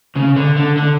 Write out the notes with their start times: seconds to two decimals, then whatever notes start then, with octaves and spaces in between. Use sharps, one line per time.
0.16 C#3
0.36 D3
0.57 D3
0.77 D3